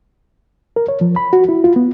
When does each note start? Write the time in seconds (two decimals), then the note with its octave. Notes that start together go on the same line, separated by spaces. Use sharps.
0.76 A#4
0.88 C#5
1.01 F3
1.16 B5
1.33 F#4
1.49 E4
1.64 F4
1.76 B3